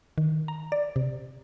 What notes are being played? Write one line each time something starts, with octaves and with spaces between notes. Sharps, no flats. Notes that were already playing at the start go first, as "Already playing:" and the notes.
D#3
A#5
D5
C3